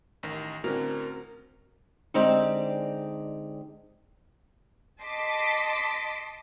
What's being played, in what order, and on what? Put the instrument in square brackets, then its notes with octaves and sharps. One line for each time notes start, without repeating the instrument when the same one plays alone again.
[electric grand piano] A1 D#3 A#6
[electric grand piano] A2 D3 [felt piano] C4 C#4 F#4 [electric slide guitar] A#4
[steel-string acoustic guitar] D3 G#3 C4 D#4 G4 D5
[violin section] D#5 A5 C6 D6 B6 C7